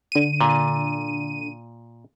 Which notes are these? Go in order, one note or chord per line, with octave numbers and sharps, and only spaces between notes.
D3 D#7
A#2